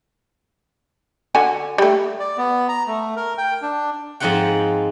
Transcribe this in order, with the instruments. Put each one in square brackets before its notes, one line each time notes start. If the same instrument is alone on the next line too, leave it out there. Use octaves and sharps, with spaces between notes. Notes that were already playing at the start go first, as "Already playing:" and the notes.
[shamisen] D3 F#4 G#5
G3 A3
[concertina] D5
B3
A#5
A3
A#4
G5
D4
[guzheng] G#2 F3 C4 D#4 F#5 G5